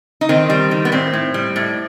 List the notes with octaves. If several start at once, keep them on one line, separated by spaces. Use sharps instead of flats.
D#4
D#3 C4
G3
D#3
B3
A2 C4
A2
G3
A2